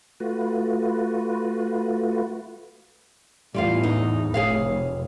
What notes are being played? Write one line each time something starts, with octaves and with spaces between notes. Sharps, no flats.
A3 F4 F#4 B4
E2 A2 G3 F4 F5
D#4
F1 G#4 C#5 F5